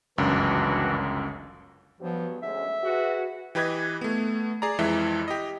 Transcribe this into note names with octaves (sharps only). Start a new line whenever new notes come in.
G1 C#2 F#2 E3 D4 F#4
G2 F3 F#3 B3
D2 G#3 C#4 E5
F#4 G#4 B4
E3 G4 B4 D#5 G#6
A3 B3
G#4 D5 A#5
F2 E3 G#3 E4 E5
G4 D#5